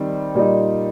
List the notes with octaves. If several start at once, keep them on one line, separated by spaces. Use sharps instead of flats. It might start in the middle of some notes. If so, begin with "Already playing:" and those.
Already playing: D#3 G3 C4
A#2 G3 D#4